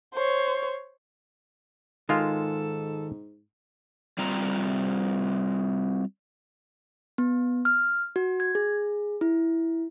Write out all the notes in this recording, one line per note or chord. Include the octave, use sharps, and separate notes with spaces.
C5 C#5
G#2 D#3 G#3 F4 A4 F5
G3 C4 F4 A#5
B3
F6
F#4
G#6
G#4
E4